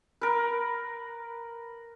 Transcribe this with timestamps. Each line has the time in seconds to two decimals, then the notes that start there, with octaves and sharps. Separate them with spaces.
0.21 A#4 B4